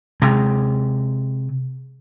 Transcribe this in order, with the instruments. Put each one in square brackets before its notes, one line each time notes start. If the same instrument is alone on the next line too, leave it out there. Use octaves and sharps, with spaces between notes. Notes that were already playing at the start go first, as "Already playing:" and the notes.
[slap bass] C3 G#3